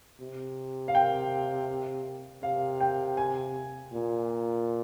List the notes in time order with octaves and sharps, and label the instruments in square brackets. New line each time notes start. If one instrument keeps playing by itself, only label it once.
[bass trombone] C3
[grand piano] F5
G5
[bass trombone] C3 [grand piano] F5
[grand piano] G5
G#5
[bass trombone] A#2